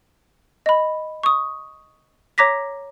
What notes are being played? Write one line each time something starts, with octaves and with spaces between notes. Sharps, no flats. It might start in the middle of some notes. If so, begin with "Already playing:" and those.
D#5 B5
C#6 D#6
C#5 A#5 D6 A#6 B6